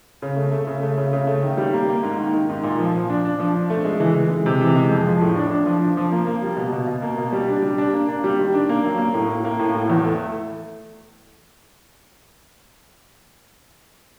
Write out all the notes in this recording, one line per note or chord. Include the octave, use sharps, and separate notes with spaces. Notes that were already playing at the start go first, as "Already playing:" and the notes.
C#3
A3
A3
C#3
A3
C#3
C#3
A3
D#3
G3
A#3
A#3
G#2
D#3
D#3
G#2
A#2
F3
F3
D4
D4
F3
D4
A3
G#3
E3
E3
G#3
C3
E3
G#3
F2
F3
A2
D4
D4
F3
D4
F3
A#3
A#3
G3
B2
B2
B2
A#3
B2
G3
D4
G3
D4
A#3
D4
G3
D#3
D4
A#3
F#3
A#3
A2
A2
A#3
A2
A2
E2
A3